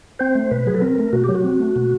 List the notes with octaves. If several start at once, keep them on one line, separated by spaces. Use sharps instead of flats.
C4 C5
A3
B2 B4
F#3 G#4
A4
C4 A#4
A3
B2 F#4
F#3 G4
F#4
C4
A3
B2